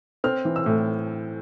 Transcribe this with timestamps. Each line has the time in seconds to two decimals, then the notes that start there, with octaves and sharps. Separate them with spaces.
0.24 C4 F6
0.45 E3
0.56 E6
0.66 A2